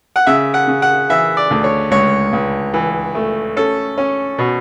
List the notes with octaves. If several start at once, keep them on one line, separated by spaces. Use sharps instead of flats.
F#5
C#3 E5
F#5
C#3
F#5
E3 E5
D5
D2
C#5
C#2 C#5
C#2
E3
A3
C#4 A4
C#4
B2